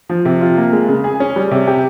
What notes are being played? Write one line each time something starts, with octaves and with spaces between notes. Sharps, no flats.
F3
C3
F4
A#3
G#3
C#3
G#4
C#4
G3
C3
G4